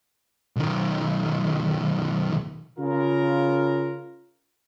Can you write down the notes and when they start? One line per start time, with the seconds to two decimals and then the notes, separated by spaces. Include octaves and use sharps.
0.56 B1 D#3
2.79 C#3 F4 A#4